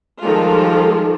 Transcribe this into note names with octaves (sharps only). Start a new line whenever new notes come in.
D#3 F3 G3 G#3 F4 A4